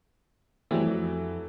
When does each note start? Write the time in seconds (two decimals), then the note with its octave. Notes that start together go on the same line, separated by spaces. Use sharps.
0.71 E3 F#3 G3 A3 C4
0.87 F2